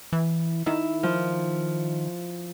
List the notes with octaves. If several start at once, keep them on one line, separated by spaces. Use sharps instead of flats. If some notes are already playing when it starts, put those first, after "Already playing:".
E3
D#3 E4
F3